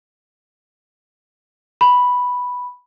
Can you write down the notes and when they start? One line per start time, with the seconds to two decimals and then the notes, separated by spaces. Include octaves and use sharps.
1.81 B5